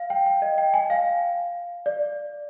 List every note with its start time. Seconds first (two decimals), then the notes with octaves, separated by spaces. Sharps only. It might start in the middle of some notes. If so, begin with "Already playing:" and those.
Already playing: F5
0.10 G5
0.26 G5
0.42 D#5
0.58 G5
0.74 G#5
0.90 F5
1.86 D5